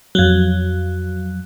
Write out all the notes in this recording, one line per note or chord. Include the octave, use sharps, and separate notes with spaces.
F2 F#3